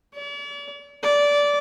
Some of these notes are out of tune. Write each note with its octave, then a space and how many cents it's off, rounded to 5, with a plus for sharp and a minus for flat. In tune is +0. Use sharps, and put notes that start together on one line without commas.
D5 -45
D5 -15